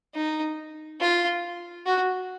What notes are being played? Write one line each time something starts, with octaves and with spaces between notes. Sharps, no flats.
D#4
F4
F#4